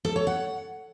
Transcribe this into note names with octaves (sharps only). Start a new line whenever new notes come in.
A4
C#5
F#5